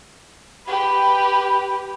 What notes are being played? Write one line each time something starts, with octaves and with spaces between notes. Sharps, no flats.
G4 B4